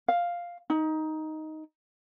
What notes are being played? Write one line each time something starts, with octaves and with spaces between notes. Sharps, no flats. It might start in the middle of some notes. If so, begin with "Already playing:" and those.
F5
D#4